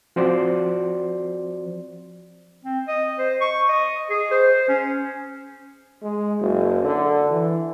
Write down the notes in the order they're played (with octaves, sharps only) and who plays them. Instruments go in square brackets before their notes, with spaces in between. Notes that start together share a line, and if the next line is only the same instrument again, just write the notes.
[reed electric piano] F3 C4 F#4 C5 D5 C6
[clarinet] C4
D#5
C5
C#6
D#5
G#4
C5
C#4
[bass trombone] G#3
F#1
D3
E3